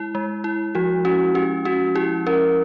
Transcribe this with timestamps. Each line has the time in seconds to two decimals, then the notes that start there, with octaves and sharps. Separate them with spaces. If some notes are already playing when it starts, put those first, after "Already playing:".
Already playing: G#3 E4
0.15 G#3
0.44 E4
0.75 F3 F#4
1.05 C#4 F#4
1.35 C#4 G4
1.65 C#4 F#4
1.95 E4 G4
2.27 C#4 A#4